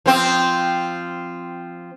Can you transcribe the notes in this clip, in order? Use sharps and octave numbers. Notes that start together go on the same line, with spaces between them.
F3 C4